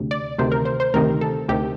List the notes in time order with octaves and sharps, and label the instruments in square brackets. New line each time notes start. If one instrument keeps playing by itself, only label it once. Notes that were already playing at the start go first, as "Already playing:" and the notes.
Already playing: [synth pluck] D2 C3
D5
D2 C3 D#3 C5
A#4
C5
C5
D2 C3 D#3 A#4
A4
D2 C3 D#3 G4